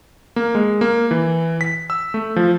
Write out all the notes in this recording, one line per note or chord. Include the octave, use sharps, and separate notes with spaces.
A#3
G#3
A#3
E3
B6
E6
A3
F3